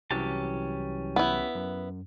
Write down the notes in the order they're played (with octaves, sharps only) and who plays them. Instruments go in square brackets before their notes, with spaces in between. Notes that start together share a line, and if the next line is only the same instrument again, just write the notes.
[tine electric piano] C2 E3 F#3 [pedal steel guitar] C#4 G4 A5
[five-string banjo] B3 E4
[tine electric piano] F#2